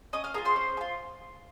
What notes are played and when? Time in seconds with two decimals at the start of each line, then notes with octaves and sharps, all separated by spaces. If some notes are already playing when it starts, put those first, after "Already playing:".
0.13 C#4 D#5 D#6
0.24 F5 F6
0.34 F4 G#4 A#4 A#5
0.45 C5 C6
0.56 C#4
0.77 G#4
0.81 F4